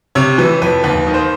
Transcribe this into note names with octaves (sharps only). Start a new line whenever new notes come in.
C3 C#5
E3 B4
F2 B4
D#2 B4
D#3
C5